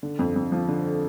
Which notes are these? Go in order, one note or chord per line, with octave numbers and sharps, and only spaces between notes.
D3
F2
F2
F3
D3